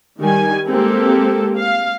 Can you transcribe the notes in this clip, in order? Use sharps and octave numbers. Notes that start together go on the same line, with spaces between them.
D#3 G3 G#5
G#3 A#3 C4 G4 A4
F5